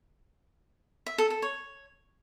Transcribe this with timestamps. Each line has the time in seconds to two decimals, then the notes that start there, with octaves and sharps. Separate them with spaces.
1.06 E5
1.18 A4
1.30 A4
1.42 C#5